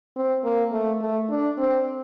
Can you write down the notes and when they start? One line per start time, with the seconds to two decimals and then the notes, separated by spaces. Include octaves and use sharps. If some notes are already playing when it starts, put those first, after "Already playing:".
0.16 C4
0.44 A#3
0.72 A3
1.01 A3
1.30 D4
1.58 C4